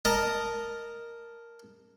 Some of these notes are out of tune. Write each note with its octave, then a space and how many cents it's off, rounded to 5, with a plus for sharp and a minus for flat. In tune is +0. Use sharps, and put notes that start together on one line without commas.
A#4 +0 D#5 -10 A5 +0